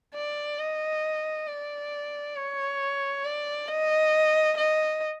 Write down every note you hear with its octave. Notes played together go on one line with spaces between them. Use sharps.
D5
D#5
D5
C#5
D5
D#5
D#5